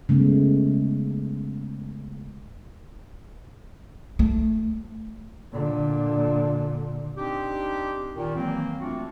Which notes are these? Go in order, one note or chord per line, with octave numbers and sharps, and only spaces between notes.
C#3 G#3 A3 B3
A3
A#2 D3
C4 D4 D#4 G4
A#2 D#3
D#3 E3 F#3 A#3 C4
A3 C4 D4 F4 F#4